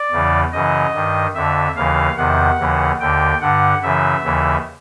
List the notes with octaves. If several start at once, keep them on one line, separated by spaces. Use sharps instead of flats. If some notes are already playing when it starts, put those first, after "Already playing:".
Already playing: D5
E2 C#3 E3
F#2 C#3 E3 D#5
G2 D#3
F2 D3 E5
D#2 C#3 E3 F5
E2 C3 D#3 F#5
D#2 C#3 E3
D#2 D3 G5
G2 D3 F#5
F#2 C#3 E3 E5
D#2 C#3 E3